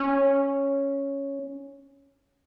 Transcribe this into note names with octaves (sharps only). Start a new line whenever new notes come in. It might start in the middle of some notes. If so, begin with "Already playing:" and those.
Already playing: C#4